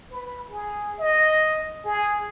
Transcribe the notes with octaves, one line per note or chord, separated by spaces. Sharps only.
B4
G#4
D#5
G#4